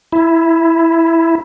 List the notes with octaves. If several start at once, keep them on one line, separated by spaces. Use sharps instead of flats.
E4